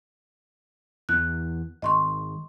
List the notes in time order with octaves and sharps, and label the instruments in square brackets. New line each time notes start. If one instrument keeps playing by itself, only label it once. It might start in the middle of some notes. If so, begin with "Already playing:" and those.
[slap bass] E2 E3 [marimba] F#6
[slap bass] G#1 [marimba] D#5 C6 C#6